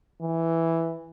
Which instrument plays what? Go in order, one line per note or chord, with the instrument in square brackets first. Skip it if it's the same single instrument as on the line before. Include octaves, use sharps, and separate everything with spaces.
[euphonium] E3